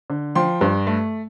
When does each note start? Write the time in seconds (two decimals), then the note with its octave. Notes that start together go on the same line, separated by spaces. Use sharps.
0.10 D3
0.35 F3 G5 C6
0.61 G2
0.87 A3